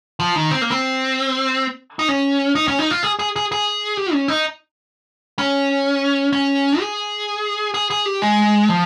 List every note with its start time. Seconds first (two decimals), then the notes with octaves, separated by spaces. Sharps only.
0.20 F3
0.36 D#3
0.51 C4
0.62 A#3
0.71 C4
1.99 D#4
2.08 C#4
2.55 D#4
2.68 C#4
2.79 D#4
2.91 F4
3.03 G#4
3.19 G#4
3.36 G#4
3.52 G#4
3.97 G4
4.13 C#4
4.28 D#4
5.39 C#4
6.33 C#4
6.80 G#4
7.74 G#4
7.90 G#4
8.06 G4
8.22 G#3
8.69 F3